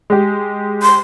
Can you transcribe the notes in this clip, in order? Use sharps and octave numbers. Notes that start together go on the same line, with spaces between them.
G#3 G4
C6